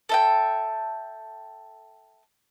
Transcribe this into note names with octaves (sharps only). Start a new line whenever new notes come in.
A4 E5 G5